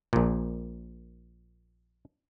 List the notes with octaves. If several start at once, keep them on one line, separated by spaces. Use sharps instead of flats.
A#1 A#2